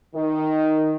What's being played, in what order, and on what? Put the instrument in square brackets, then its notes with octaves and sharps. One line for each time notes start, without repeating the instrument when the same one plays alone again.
[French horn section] D#3